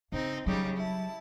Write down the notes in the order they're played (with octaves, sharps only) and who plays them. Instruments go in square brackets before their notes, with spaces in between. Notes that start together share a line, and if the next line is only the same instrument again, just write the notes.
[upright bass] C#3 [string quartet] C4 D#4
[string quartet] C#3 G3 D#4 [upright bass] F#3 C#4
[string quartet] E4 A5